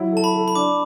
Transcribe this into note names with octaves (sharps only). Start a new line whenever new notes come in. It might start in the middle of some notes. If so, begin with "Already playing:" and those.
Already playing: F#3 E4
A4 A5
B5
A4
B5
D4 D6